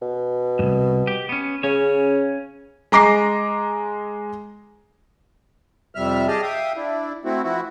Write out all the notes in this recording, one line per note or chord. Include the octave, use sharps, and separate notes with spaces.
B2
C2 G2
G4
B3 C#4
C#3 C#4 C#5
G#3 A#5 D6 A#6 C7
F2 C3 G3 E5 F6
G4 G#4 D#5 A5 F6
E5 F5 G5 D#6
D4 E4
A3 C4 E4 F#4
E3 F3 E4 F#4